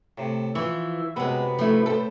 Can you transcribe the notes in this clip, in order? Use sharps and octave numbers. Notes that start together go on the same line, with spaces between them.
A2 C3
E3 F3 E5 C#6
F#2 C3 G#3 B3 B4
F3 A3 E4
A2 A4 C5